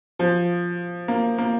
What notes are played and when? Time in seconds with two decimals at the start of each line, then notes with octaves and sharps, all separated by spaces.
0.19 F3
1.08 A#3
1.38 A#3